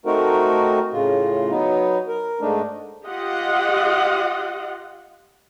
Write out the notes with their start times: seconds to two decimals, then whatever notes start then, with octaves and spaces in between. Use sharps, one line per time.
0.06 A3 C4 D#4 F#4 A#4
0.93 A2 C#3 F4
1.51 F#3 B3 D#4
2.08 A#4
2.41 G#2 A3 D4 D#4
3.06 F4 G4 D#5 F#5